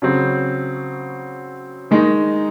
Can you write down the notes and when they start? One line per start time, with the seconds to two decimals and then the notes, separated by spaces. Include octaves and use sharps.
0.02 C#3 F#3 C4
1.91 D#3 G#3 D#4